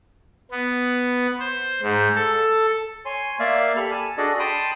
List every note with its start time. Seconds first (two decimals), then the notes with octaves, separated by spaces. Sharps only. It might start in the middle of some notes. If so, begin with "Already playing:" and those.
0.51 B3
1.39 C5
1.82 G#2
2.16 A4
3.05 C#5 G#5 C6
3.39 A#3 D5 E5 F5
3.76 G4 A4 B5 F6
3.91 G#5 A5
4.18 D4 F#4 G#4 A4 D5 D#5
4.39 G5 A5 B5 C6 D#6